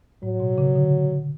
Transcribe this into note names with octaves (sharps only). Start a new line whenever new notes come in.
A2 F#3
B2
C#3
D3